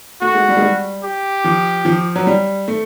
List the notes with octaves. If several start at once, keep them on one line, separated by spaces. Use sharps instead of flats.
A3 F#4
G#3
G3
G#3
G3
G4
F3
F3
F#3
G3
A3